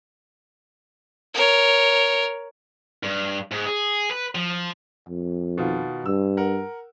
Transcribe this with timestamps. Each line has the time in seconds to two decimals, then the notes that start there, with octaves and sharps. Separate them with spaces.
1.35 A#4 C#5
3.03 G2
3.51 G#2
3.67 G#4
4.11 B4
4.35 F3
5.09 F2
5.58 B2 D#3 F4
6.06 G2 E6
6.37 A#4 F#5